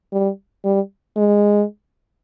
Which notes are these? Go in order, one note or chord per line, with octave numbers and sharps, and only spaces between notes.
G3
G3
G#3